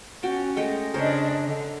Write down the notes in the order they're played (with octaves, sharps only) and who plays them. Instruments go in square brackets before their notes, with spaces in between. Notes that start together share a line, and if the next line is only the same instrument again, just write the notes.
[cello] C#4 [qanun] F#4 G5 A5
[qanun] G#3 A3 G5 [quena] D#5
[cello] C#3 D4 [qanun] A#4 C5 C#5
[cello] D3